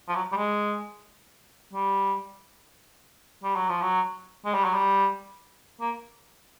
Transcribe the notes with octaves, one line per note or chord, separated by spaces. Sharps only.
F3
F#3
G3
G#3
G3
G3
F#3
F3
F#3
G#3
G3
F#3
G3
A#3